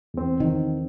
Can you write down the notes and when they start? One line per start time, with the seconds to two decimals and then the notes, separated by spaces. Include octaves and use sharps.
0.14 E2 C4
0.40 D#3